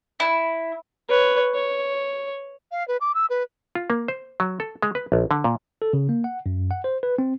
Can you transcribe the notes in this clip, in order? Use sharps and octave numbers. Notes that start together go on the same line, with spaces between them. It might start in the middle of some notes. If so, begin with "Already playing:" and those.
E4
B4 C#5
C#5
F5
B4
D6
E6
B4
F4
A#3
C5
F#3
A4
G#3
B4
A#1
D3
A#2
A4
C#3
A#3
F#5
F#2
F#5
C5
B4
C4